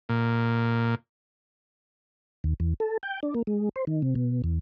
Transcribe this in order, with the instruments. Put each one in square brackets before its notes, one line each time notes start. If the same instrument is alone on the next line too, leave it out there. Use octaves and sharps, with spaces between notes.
[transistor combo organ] A#2
[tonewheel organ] D#2
E2
A4
G5
D4
A#3
G#3
C5
D#3
C3
B2
E2